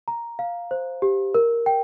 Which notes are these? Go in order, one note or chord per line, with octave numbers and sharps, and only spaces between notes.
A#5
F5
C5
G4
A#4
G5